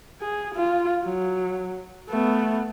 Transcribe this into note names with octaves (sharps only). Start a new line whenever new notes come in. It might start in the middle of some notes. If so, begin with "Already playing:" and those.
G#4
F4
F#3
A3 B3